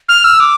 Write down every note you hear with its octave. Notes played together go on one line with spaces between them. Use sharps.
F6
E6
D6